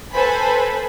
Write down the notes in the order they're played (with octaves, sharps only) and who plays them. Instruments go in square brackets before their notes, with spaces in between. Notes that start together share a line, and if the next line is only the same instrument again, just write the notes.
[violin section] A4 B4 C5 G#5 B5